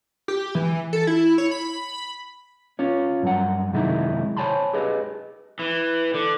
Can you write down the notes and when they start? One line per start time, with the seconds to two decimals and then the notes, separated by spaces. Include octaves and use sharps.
0.28 G4
0.55 E3
0.93 A4
1.07 E4
1.38 C#5
1.51 B5
2.79 C#4 F4 C#5
3.23 G2 F#3 F#5
3.73 F#2 C3 D#3 G#3 D#4 E4
4.37 C5 C#5 G#5 A5 B5 C6
4.73 G4 G#4 B4 D#5
5.59 E3
6.14 D3